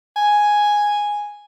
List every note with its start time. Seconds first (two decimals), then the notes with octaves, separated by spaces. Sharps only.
0.16 G#5